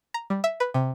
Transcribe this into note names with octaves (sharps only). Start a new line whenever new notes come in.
A#5
G3
E5
B4
C3